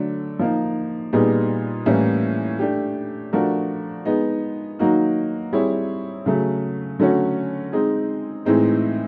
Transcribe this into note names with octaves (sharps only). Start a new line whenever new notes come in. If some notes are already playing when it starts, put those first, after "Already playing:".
Already playing: D3 F#3 A3 D4
F3 A#3 D#4
A#2 G3 B3 D#4 G#4
A2 E3 G3 A#3 C#4
A3 D4 G4
F3 A3 D4 F#4 A#4
G#3 B3 D#4
D#3 F#3 A#3 D#4 F#4
G3 C4 E4 G#4 C#5
C#3 F#3 A3
D3 F#3 A3 C#4 F#4
G#3 C4 D#4 G#4
A2 E3 G#3 C4 D#4